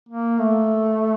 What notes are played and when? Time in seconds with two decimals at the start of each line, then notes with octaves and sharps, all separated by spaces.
0.09 A#3
0.39 A3